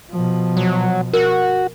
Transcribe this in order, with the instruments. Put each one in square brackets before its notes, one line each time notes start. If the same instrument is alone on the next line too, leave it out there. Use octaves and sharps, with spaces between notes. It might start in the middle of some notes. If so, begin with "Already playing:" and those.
[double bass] B2 F3
[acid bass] F#3
[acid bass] F#4 [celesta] A#4